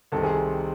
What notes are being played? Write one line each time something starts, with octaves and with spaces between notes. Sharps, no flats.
C2 C3 D#3 A4
G#4